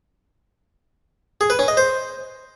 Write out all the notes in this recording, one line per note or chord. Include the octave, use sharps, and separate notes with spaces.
G#4
B4
C#4
D#5
C5